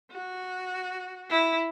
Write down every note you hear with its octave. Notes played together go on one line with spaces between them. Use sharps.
F#4
E4